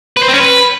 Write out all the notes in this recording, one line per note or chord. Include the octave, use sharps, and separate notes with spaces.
B4
C5
C4
C#4
B4